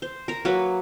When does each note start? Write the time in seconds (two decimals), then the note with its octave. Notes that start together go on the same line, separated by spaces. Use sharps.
0.02 C5
0.28 A#4 A#5
0.45 F#3 A#3 B4